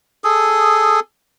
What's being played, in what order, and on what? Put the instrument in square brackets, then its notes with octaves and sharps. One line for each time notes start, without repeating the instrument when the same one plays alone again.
[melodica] G#4 A4 D#6